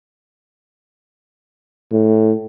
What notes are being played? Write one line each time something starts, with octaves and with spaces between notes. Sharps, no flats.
A2